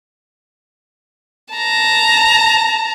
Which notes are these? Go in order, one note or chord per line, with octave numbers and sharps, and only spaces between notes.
A5 A#5